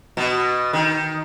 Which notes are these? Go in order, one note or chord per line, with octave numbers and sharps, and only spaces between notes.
B2
D#3